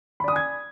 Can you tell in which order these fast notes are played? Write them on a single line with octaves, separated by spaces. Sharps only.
B5 D5 D#6 G#5 G#6